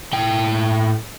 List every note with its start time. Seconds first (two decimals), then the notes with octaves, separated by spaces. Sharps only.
0.13 A2 G5